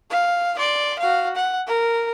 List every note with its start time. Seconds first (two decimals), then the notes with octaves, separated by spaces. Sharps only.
0.10 F5
0.59 D5 C6
0.99 F#4 F5
1.36 F#5
1.67 A#4